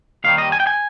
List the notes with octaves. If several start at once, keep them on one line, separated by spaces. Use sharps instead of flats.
D#2 D#3 G3 F5
D#5
G#5
G5
G#5